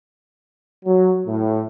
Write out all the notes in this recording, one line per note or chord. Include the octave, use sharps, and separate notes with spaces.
F#3
A2